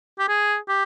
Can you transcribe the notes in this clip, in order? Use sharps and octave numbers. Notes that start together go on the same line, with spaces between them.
G4
G#4
G4